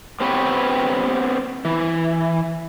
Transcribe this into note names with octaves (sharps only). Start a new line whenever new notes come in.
B3 C4 G4 B4 C#5
E3